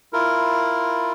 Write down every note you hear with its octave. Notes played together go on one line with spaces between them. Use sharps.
E4 F4 A#4